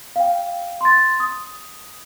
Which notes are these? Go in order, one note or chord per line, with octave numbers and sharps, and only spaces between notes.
F5 G5
C6 A6
D#6